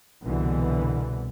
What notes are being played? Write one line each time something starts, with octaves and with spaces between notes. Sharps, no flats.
C2 B2 D3 E3